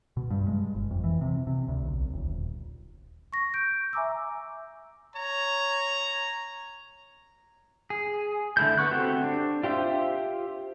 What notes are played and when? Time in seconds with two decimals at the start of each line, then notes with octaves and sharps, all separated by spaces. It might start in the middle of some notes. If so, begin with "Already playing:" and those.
0.17 B2
0.30 G2
0.48 G#3
0.75 G1
0.91 F2
1.04 E3
1.21 C3
1.47 C3
1.68 D2
1.83 B1
2.13 D#1
3.33 C#6 A#6
3.54 G6 D7
3.93 E5 G#5 A#5 D6 E6
5.16 C#5 A#5
7.90 G#4
8.57 D3 A3 E4 G6
8.78 B3 C#6 F#6
8.91 C4 F#4 G4 A4
9.24 D4
9.63 F4 G4 C5 E5